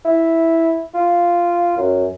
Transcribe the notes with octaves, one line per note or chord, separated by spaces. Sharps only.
E4
F4
F#2